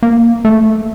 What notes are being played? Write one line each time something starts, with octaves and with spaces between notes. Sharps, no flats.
A#3
A3